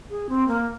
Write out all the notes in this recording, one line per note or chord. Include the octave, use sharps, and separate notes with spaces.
G#4
C4
A#3